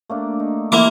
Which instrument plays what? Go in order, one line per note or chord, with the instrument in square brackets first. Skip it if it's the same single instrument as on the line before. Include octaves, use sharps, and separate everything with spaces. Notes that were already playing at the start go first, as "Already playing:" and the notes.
[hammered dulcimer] A3 A#3 D4
D#4
[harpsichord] A#3 E4 D6 [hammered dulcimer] F4 G4